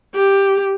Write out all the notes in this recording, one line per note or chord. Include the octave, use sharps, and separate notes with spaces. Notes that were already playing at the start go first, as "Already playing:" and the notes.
G4